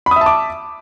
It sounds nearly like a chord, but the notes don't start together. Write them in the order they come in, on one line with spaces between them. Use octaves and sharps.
B5 D#6 E5 A5 D6